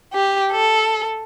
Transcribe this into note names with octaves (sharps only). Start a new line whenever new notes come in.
G4
A4